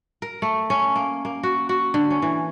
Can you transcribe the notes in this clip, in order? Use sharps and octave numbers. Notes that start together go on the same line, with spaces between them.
A#4
A3
C#4
A#3
A#3
F#4
F#4
D3
C#4
E3